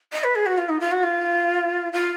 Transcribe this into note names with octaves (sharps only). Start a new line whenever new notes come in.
D#5
B4
G#4
F#4
F4
D#4
F4
F#4
F4
F4